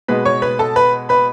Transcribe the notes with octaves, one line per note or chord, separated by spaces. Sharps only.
B2 G#3 B3 B4 B5
C#5 C#6
B4 B5
A4 A5
B4 B5
B4 B5